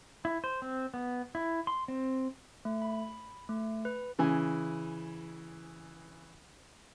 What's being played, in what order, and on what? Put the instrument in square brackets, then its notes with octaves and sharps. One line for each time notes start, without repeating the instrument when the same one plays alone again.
[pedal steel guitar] E4
C5
C4
B3
E4
C6
C4
[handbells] A3
B5
A3
B4
[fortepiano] C#3 E3 G#5